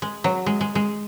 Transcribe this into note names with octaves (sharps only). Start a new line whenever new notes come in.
G#3
F#3
G#3
G#3
G#3